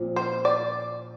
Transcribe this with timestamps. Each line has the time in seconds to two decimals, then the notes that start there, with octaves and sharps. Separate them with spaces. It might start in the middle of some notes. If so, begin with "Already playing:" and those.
Already playing: A#2 F3 C4
0.16 C5
0.45 D5